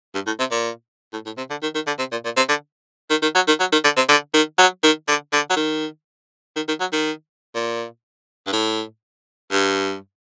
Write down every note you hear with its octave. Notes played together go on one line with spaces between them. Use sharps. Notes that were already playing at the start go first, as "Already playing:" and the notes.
G2
A2
C3
A#2
A2
A2
C3
D3
D#3
D#3
D3
C3
A#2
A#2
C3
D3
D#3
D#3
F#3
D#3
F#3
D#3
D3
C3
D3
D#3
F#3
D#3
D3
D3
F#3
D#3
D#3
D#3
F#3
D#3
A#2
G2
A2
G2